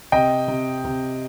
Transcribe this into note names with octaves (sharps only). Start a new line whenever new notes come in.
C3 D#5 G5
C3
C3